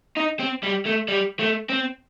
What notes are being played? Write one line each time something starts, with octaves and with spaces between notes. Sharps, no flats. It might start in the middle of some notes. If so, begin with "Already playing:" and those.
D#4
C4
G3
A3
G3
A3
C4